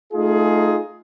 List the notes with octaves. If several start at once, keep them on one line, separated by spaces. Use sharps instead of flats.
A3 D#4 F4 G#4